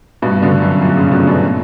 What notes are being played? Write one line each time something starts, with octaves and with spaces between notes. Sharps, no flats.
G2 B2
B2 D3
F#2
F#2 A#2
A#2 C#3
B2 D3
B2 D3
A#2